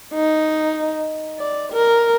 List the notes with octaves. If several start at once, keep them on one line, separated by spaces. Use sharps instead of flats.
D#4
D5
A#4